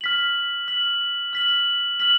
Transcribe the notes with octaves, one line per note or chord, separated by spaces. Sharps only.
F6 B6 F#7
F6 B6 F#7
F6 B6 F#7
F6 B6 F#7